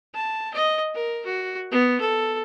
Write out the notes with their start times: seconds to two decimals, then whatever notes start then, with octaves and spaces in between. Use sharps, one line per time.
0.15 A5
0.54 D#5
0.95 A#4
1.26 F#4
1.71 B3
2.01 A4